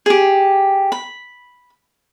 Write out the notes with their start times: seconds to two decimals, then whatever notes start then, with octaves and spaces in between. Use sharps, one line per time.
0.06 G4 G#4
0.92 B5